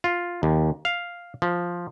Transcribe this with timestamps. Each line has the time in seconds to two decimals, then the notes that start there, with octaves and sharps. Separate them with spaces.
0.04 F4
0.43 D#2
0.85 F5
1.42 F3